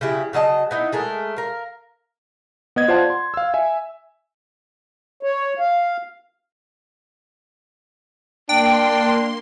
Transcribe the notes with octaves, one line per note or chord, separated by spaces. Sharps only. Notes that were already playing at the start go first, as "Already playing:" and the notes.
C#3 F#3 E4 G4
C#3 F#3 D#5 A5
B3 D#4 E4
G#3 A3 A#4
A#4 F5
B3 D#5 G#6
F4 C5 D5 F#5 A5
C6
F5 E6
E5 G#5
C#5
F5
A#3 D4 G5 C6